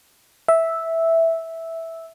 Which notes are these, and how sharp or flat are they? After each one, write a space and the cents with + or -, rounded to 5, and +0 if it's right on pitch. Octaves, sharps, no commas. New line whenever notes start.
E5 -5